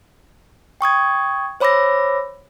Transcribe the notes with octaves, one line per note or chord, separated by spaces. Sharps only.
G5 C#6 D#6 G#6
C5 C#5 B5 D6 E6 A#6